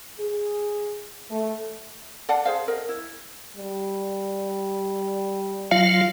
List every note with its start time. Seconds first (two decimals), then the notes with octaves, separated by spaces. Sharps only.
0.20 G#4
1.31 A3
2.29 D5 F5 F#5 A5
2.45 G#4 C5 F5
2.68 A#4 D#5
2.89 E4
3.56 G3
5.71 F#3 F4 F5